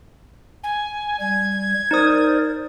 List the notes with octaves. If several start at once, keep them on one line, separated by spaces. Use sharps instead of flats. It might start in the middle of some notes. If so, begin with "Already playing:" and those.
G#5
G3 G#6
D#4 A#4 C5 D5 D#6